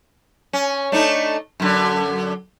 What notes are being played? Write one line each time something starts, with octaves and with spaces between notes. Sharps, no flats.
C#4
A3 D4 D#4
F#2 D3